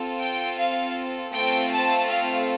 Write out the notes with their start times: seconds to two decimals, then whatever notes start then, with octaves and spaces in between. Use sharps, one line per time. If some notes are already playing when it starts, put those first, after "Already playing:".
Already playing: C4 F4 A4
0.19 G5
0.57 F5
1.32 A3 C4 F4 A4 G5
1.71 A5
2.09 F5